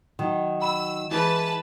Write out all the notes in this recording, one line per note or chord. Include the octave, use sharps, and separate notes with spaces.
D#3 F#3
B5 E6
E3 G#3 B4 A5